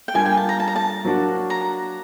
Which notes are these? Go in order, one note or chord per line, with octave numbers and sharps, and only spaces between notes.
G5
G3 A#3 D4 F4 G#5
G5
A5
A#5
A5
A#5
A5
F#3 A#3 D4 F#4
A#5